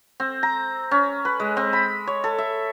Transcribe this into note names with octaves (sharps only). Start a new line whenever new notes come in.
C4
A#5
C#4
B4
G#3
C4
B5
C#5
A4
E5